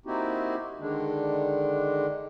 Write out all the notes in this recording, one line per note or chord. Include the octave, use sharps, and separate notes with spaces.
A#3 C4 D#4 E4 F#4 G4
D3 D#3 G#3 D4